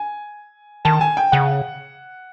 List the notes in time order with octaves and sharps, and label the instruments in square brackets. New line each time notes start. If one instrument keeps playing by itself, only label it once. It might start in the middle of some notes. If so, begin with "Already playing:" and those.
Already playing: [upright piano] G#5
[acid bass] D#3 [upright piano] A5
[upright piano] G#5
G5
[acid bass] C#3 [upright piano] F#5